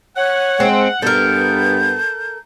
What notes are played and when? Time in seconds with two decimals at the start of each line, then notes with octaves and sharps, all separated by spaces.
0.16 C#5 F#5
0.60 G#3 C4
1.02 G2 B3 A4 A#4 G6